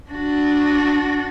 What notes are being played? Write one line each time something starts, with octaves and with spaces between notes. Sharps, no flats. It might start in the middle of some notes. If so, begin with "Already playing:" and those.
D4 F#4